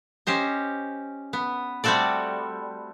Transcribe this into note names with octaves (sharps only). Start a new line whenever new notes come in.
C#4 G4 C5 D#5
B3
G3 A3 C4 F#4 A4 D5